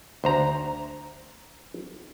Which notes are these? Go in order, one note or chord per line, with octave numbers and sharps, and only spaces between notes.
D2 C5 A#5